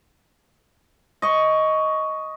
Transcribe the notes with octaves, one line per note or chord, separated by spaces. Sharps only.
D#5 C#6